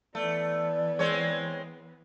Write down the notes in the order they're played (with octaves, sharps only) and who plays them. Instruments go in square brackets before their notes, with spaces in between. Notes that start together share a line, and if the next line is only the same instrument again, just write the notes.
[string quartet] E3 B3 [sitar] A3 [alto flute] D5
[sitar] G#3 C4 C#5